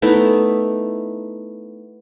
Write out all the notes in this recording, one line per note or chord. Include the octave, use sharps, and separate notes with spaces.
A3 B3 D#4 E4